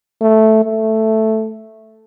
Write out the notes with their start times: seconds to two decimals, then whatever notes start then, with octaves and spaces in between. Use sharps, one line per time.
0.21 A3
0.64 A3